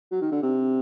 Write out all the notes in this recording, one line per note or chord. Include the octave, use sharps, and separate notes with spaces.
F#3
D#3
D3
C3